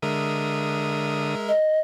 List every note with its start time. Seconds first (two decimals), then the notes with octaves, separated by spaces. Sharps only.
0.02 D3 G#3 A#4 E5 D#6
1.48 D#5